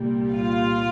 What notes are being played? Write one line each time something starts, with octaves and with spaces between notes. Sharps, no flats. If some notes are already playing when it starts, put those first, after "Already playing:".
Already playing: C2 A#2 G3
F4 F5